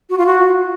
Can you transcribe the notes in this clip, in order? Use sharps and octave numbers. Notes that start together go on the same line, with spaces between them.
F#4
F4
F#4